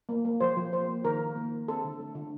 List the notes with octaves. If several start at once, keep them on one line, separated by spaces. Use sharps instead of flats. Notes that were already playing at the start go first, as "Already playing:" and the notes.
A#3
A#3
F3 C5
F3
A#3 C5
A#3
D#3 A#4
D#3
A#3
A#3
C4 A4
D3
A3
D3